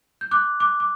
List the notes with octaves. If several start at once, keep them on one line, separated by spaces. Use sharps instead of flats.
G6
D6 F#6
D6 F#6
D6